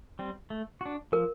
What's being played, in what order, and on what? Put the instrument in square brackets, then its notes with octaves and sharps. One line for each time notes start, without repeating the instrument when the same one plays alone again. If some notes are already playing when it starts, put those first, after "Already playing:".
[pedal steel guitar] G3 C4
A3
D4 F#4
[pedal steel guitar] F3 [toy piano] A#4